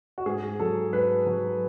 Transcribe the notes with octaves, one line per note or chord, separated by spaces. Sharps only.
F#4
G#2 G#4
F#3 A4
G#2 B4
F#3